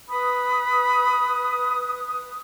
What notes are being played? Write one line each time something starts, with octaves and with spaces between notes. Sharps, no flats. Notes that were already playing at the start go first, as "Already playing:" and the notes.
B4 B5 D#6